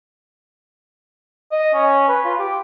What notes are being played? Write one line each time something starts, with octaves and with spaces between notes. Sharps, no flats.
D#5
C#4
B4
F4
G4